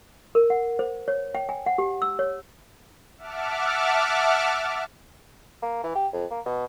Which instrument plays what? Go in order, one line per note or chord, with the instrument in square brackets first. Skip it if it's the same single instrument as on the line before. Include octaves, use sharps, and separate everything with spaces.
[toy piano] A#4
F#5
C5
C#5
G5
G#5
F#5
G4
E6
C#5
[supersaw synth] E5 F#5 A5 D6 F6
[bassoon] A#3
E3
G4
F2
A#3
B2